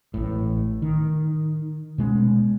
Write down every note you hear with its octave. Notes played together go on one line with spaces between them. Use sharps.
A1 A2
D#3
B2 G#3 A3 C#4